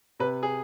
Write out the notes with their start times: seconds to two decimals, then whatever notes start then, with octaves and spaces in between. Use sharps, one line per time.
0.20 C3 B4
0.43 G#4